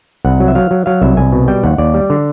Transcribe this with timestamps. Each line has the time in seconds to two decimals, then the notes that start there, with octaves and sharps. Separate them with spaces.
0.25 C2 F#5
0.40 F#3
0.48 E5
0.55 F#3 F5
0.71 F#3
0.86 F#3 F5
1.02 C2 E5
1.17 C2 G#5
1.32 B2
1.48 G3 G5
1.63 D#2 F#5
1.78 D#2 D5
1.94 G3
2.10 D3